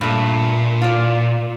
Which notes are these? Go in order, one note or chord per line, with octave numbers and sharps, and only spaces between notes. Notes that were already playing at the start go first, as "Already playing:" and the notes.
G2 A#2 A3
F4 D5